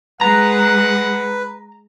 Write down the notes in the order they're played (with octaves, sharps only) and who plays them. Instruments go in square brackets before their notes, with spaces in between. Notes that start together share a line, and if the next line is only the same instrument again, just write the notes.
[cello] G#3 [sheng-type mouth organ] B4 [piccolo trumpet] F#5 [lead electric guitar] A#5